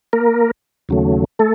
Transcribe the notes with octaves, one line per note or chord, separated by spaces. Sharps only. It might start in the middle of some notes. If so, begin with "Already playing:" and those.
A#3 A#4
D#2 C#3 F#3 A3
A3 A4